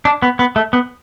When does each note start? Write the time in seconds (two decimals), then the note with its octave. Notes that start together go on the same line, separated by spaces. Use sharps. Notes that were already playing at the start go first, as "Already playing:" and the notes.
0.05 D4
0.22 B3
0.39 B3
0.56 A3
0.73 B3